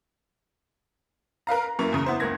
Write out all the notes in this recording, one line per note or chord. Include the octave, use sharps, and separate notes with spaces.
A#4 B4 F5 A#5
A#5
F#2 A#3 E4 C#6 F7
E2 C#3 A#5
B3 E4 C5
F#1 C#2 A#3 G#6 A#6